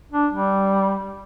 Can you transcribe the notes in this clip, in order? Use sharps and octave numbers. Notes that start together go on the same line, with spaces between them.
D4
G3